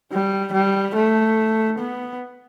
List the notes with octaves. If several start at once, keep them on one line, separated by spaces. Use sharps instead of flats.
G3
G3
A3
B3